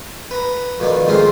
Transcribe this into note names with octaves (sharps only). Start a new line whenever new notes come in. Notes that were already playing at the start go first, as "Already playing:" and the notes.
B4 A#5
F2 B2 D#3 D4
F2 A#2 C#3 G#3 C4 F4